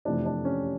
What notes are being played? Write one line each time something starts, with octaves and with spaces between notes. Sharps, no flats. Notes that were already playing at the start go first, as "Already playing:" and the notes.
F2 C3 E3 A3 D4
D4
C#4